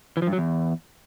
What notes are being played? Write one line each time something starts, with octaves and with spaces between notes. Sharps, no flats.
E3
F3
G2
F#3
E2